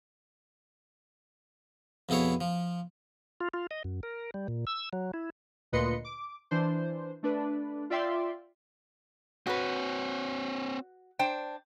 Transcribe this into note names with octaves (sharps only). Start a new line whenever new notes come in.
F2 B2 E4 G#4 C#5
F3
F4
F4
D#5
F#2
A#4
G3
A#2
E6
F#3
E4
D2 A#2 B4 D#5 C6 C#7
D6
E3 D4 C5
A3 D4 B4
F4 D5 E5 G5 C6
C4 F#4 B4 C#5
D4 C5 G5